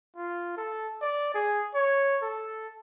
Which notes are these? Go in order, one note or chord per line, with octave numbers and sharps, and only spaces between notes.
F4
A4
D5
G#4
C#5
A4